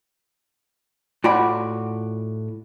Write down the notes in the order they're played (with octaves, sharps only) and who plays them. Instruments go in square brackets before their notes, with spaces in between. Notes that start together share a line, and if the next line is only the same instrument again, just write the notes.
[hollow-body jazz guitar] A2 F4 F#4 D5 F#5 B5